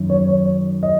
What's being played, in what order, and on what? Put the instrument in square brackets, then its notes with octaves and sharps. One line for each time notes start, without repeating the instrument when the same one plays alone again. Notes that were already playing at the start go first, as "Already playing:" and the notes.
Already playing: [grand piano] F#2 D#3
C#5
C#5
D#5